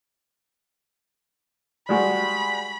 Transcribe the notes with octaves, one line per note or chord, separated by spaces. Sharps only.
G3 G#3 F#4 B5